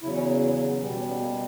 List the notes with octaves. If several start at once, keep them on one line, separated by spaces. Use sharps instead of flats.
E2 C#3 F#3 E4
C#4
B3
C#4
C#4
B3
B2 G3 B3
C#4
B3
A#3